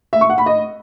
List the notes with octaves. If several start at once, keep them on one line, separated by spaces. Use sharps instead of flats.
E5
C#6
F#5
B5
D#5